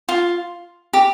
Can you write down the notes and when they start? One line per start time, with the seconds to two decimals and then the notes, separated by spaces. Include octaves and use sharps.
0.09 F4
0.93 G4